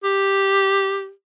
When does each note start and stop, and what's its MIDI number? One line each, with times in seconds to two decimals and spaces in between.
0.04 1.10 67